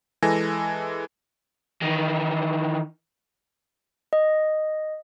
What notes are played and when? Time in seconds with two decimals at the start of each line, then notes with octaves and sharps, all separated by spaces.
0.22 E3 G#3 A4 G#5 A#6
1.82 D#3 E3
4.13 D#5